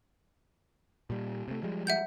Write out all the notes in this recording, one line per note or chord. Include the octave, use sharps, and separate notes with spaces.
A#2 G3
C3 A3
F3 G3 G#3
E5 F#5 G6